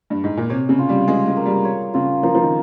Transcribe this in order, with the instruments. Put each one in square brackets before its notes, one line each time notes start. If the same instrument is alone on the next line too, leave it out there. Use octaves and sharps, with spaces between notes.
[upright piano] G2
G#2
A#2
[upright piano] C3 [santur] C#5
[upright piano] C#3
[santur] F4
[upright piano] G3
[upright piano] G#3 [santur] G#4
[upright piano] G#3
[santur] A#3
[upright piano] G3
[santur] C#5
[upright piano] C#3 [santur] F4
[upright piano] F3 [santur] A#4
[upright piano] F3
D#3